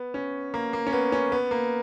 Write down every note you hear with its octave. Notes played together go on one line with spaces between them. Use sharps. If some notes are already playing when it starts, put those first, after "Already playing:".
Already playing: B3
C#4
A#3
A#3
C#4
B3
C#4
B3
A#3